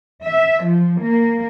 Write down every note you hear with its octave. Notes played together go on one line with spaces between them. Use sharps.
E5
F3
A#3